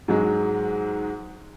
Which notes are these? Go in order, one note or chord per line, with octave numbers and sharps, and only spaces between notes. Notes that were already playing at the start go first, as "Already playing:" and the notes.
G#2 F#3 G#3